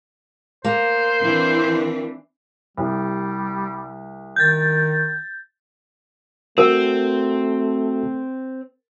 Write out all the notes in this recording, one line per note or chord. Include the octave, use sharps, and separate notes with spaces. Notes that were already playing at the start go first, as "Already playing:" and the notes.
A#3 C5
E3 C4 D4
C2 G3
D#3 G6 A6
A3 C4 F#4 A#4